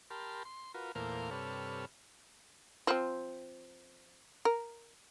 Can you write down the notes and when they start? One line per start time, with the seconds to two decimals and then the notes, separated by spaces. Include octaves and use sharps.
0.10 G4 A#4 A5 B5 C6 F6
0.45 C6
0.74 F4 F#4 A#4 B4
0.95 E2 A#2 A3 A#4 C5 F5
1.31 G2 C3 A4 B4 C#5 F6
2.87 F3 C4
4.45 A#4